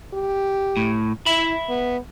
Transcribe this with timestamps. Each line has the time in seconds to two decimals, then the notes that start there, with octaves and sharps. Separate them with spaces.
0.14 G4
0.77 A2
1.26 E4 E5 B5
1.69 B3